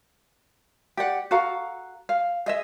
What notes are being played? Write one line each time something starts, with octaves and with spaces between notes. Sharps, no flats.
G4 D5 F#5
F#4 A4 F5 A#5
F5
G#4 D#5 E5